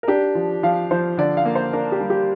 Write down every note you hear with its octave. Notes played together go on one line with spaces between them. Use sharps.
A#4
D4 G4
F3
F3 F5
F3 C5
D3 D5
F5
A#3
C5
D4 A#4
G4
G3
G4